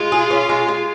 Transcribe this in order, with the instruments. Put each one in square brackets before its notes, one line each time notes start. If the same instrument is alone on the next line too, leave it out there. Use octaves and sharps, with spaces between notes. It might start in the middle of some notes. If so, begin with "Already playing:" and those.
Already playing: [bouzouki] G#3 [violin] F4
[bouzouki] G#4
C#4
G#3
G#3